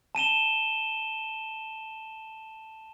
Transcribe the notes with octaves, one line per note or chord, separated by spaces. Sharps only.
A5 D#7 E7 G7